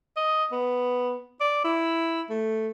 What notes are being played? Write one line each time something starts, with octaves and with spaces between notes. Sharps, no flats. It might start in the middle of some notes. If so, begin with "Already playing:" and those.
D#5
B3
D5
E4
A3